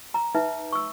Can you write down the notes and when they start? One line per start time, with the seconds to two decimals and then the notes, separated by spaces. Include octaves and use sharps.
0.14 A#5
0.35 D#4 B4 E5
0.73 C#6 E6